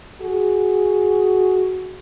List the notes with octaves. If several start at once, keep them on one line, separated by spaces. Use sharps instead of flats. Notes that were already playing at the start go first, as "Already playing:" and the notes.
F#4 G#4